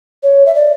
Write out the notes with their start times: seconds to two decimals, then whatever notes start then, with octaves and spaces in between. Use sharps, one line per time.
0.23 C#5
0.46 E5
0.55 D5